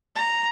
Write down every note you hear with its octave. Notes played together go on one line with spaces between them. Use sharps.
A#5